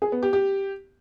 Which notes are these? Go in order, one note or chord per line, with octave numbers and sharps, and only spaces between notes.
G#4
B3
G4
G4